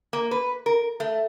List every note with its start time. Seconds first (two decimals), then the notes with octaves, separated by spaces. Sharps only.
0.13 A#3
0.31 B4
0.66 A#4
1.00 A3